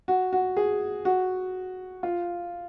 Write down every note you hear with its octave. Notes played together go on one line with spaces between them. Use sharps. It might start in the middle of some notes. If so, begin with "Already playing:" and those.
F#4
F#4
G#4
F#4
F4